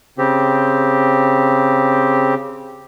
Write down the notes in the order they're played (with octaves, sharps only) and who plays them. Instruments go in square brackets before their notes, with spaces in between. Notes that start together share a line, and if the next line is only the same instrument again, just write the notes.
[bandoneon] C#3 C4 G4